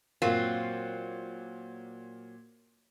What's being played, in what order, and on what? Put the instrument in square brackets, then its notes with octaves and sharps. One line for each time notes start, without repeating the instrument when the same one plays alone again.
[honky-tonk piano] A#2 A#3 [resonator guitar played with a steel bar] F#3 C4 F4